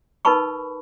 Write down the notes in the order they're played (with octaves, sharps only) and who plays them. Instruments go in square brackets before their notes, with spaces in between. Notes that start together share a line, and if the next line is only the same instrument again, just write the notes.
[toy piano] D#4 A#4 B4 A5 B5 C#6